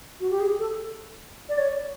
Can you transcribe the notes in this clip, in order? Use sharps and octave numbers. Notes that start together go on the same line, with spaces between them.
F#4
G4
G#4
A4
D5
C#5